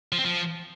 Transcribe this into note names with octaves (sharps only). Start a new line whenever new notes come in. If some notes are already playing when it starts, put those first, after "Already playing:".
F3
C4
F3